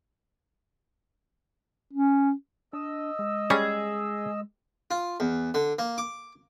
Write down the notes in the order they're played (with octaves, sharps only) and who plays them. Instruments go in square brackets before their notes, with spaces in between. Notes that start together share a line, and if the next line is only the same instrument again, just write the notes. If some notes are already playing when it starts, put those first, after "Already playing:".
[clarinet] C#4
[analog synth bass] D4 [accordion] D#5 E6
[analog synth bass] G#3
[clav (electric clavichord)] G3 C#4 [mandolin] G#4
[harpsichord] F4
E2
D3
A#3
D6